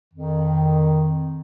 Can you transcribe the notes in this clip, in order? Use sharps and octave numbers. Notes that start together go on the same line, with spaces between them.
F2 D#3